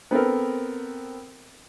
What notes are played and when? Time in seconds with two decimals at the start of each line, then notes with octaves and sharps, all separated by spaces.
0.11 B3 C4 A4 A#4